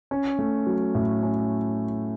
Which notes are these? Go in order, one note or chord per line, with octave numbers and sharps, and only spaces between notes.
C#4
A3
F#3
A2
C#4